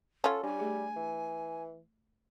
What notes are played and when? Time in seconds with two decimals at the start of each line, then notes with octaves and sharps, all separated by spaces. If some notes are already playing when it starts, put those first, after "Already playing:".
0.24 C#4 F4 A4 F#5
0.43 G3 D4 G4 G#5
0.59 A3 G#4
0.96 E3